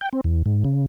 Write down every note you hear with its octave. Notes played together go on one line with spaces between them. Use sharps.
G5
C4
E2
G#2
C#3